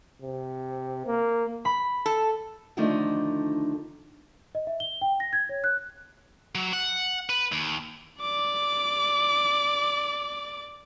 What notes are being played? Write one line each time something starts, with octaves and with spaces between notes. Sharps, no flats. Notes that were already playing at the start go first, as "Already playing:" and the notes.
C3
A#3
B5
A4
D3 D#3 F3 A3 D4 D#4
D#5
E5
G7
G5
A#6
G#6
C#5
F#6
F#3
F#5
B4
D#2
D5 D6